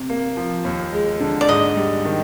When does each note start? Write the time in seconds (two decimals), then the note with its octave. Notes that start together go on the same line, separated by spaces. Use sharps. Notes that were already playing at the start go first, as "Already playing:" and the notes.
Already playing: C3
0.10 A#3
0.37 F3
0.65 D#2
0.93 G#3
1.20 D3
1.41 D5
1.48 G#2 D#5
1.77 G3
2.05 D#3